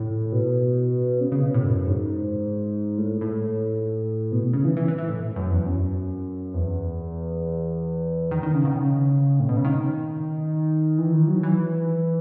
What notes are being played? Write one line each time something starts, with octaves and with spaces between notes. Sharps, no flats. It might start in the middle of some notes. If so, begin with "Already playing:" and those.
Already playing: A2
B2
C#3
C#3
B2
A2
F#2
G#2
A2
A2
B2
C#3
E3
E3
E3
E3
A2
F#2
E2
F#2
E2
D#3
D#3
C#3
B2
D#3
C#3
A2
B2
C#3
D#3
E3
D#3
F#3
E3